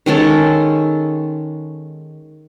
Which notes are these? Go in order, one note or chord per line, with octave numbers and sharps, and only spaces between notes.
D#3 G#3 C#4 A4